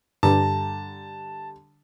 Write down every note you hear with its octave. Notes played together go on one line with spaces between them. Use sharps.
G2 D3 G3 A5 A#5